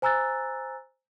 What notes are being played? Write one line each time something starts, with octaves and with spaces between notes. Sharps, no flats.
C5 G#5 A#5 E6 F#6 A6